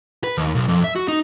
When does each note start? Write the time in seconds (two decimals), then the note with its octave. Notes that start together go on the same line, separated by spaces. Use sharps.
0.24 B4
0.38 D#2
0.55 B1
0.68 F2
0.84 E5
0.96 F#4
1.08 D#4